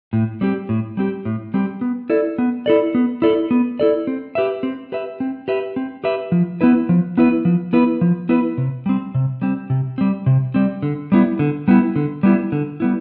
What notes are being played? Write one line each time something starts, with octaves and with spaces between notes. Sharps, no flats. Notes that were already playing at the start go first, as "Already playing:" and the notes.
A2
G3 C4 G4
A2
G3 C4 G4
A2
G3 C4 G4
B3
E4 A4 D5
B3
E4 A4 D5
B3
E4 A4 D5
B3
E4 A4 D5
C4
G4 B4 E5
C4
G4 B4 E5
C4
G4 B4 E5
C4
G4 B4 E5
F3
B3 E4 B4
F3
B3 E4 B4
F3
B3 E4 B4
F3
B3 E4 B4
C3
G3 C4
C3
G3 C4
C3
G3 C4
C3
G3 C4
D3
G3 B3 E4
D3
G3 B3 E4
D3
G3 B3 E4
D3
G3 B3 E4